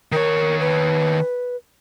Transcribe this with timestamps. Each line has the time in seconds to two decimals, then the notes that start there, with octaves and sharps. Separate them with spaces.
0.12 D#3 A#4 C#5
0.60 B4